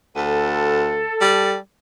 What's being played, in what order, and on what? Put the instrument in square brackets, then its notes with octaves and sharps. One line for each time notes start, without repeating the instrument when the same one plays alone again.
[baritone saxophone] D2 [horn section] A4
[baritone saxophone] G3